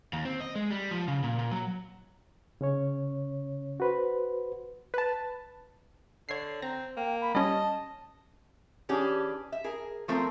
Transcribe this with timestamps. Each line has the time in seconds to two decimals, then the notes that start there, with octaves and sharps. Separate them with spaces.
0.13 D#2
0.25 C4
0.41 D#5
0.55 G#3
0.71 G3
0.91 F3
1.08 C#3
1.23 A#2
1.39 A#2
1.51 F#3
2.61 C#3 C#4 C#5
3.80 F#4 B4 C5
4.94 B4 A5
6.29 D3 C#5 C7
6.62 C4 A#5
6.97 A#3 G5
7.21 B5
7.35 G3 C#4 D#5 A5
8.89 E3 C#4 D4 G4 G#4
9.52 E5
9.64 G#4 A#4
10.08 F3 A3 C4 A#4